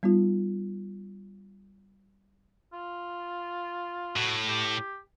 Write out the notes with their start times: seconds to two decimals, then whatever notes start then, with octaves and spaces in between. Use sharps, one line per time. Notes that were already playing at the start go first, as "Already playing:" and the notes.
0.03 G3 B3 D#4 F4
2.73 F4
4.16 A2 F#4
4.48 G4